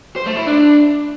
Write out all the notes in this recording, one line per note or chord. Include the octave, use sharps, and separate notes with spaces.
C5
A3
E4
D4